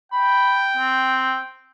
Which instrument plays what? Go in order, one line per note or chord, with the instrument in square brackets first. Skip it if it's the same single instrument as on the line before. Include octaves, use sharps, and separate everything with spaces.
[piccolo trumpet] G5 [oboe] B5
[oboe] C4